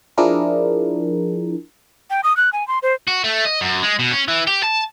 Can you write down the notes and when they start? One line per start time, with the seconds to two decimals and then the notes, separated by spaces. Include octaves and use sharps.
0.18 F3 D4 E4 G#4 A#4
2.10 G5
2.24 D#6
2.37 F#6
2.53 G#5
2.68 C6
2.83 C5
3.08 F#4
3.24 A3
3.45 D#5
3.61 F#2
3.82 G#3
3.99 B2
4.11 C#4
4.28 E3
4.47 G4
4.64 A5